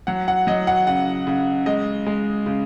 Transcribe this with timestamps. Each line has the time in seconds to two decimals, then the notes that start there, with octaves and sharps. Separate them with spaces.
0.07 F#3 F#5
0.28 F#5
0.47 F#3 D#5
0.67 F#5
0.87 C#3 F#5
1.27 C#3
1.66 G#3 D#5
2.07 G#3
2.46 C#3